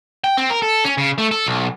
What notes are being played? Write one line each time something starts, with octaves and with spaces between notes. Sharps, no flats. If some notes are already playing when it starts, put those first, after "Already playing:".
G5
C4
A#4
A4
C#4
C#3
A3
A4
B1